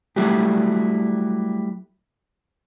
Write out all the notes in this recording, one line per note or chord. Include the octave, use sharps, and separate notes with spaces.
F#3 G3 A3 E4 F#4 G4